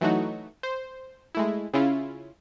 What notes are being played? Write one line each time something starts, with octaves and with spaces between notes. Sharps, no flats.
E3 F#3 A3 D#4 F#4
C5
G#3 A3 E4
C#3 C#4 E4 F4